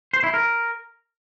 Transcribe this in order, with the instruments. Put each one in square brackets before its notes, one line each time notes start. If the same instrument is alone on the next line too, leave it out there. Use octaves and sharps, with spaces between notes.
[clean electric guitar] C5
E4
A#4